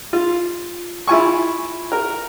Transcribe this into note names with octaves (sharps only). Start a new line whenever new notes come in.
F4
E4 F4 G#5 C#6
A#4